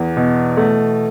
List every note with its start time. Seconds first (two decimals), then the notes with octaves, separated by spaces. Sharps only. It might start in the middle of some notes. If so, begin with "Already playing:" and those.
Already playing: E2 E3
0.17 B2
0.57 A3